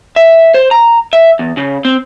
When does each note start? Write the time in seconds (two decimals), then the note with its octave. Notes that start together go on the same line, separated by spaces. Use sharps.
0.16 E5
0.54 C5
0.71 A#5
1.13 E5
1.39 E2
1.57 C#3
1.85 C4